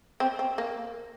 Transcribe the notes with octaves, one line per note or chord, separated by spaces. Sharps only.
C4
C4
A#3